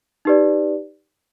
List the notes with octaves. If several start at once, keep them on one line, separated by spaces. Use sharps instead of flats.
D#4 G4 B4 D5